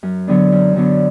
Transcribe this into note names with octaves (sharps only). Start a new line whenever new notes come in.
F#2
D3 F#3 B3 D4
F#2
D3 F#3 B3 D4